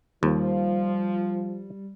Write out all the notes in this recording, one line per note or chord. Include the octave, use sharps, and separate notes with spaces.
D#2 F3 G3